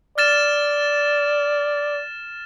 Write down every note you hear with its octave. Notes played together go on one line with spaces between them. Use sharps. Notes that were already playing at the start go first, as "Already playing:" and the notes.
D5 F6 A6 E7